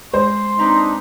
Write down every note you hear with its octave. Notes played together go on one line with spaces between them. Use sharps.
G#3 C5 C6
C4 D4 D#4 B4 A#5